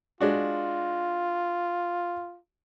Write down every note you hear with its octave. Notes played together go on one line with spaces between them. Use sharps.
G#3 D4 F4 F#4